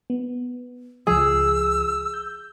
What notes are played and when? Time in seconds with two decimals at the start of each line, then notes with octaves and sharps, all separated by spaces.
0.10 B3
1.07 C#2 F3 G#4 E6
2.14 G6